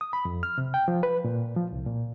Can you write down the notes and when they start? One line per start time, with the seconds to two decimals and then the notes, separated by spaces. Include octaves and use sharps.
0.01 D#6
0.13 B5
0.25 F2
0.43 F6
0.58 C3
0.74 G5
0.88 F3
1.03 B4
1.24 A#2
1.56 F3
1.72 C2
1.86 A#2